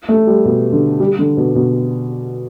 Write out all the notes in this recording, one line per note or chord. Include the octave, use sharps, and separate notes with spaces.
A3
G3
B2
D3
G3
D3
B2
B2